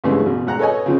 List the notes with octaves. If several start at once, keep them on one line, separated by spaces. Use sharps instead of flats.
C2 G2 C#3 E3 G#3 A3
A1 B2
G#1 F#5 A#5
A4 B4 C#5 D#5 G#5
C#3 F3 C4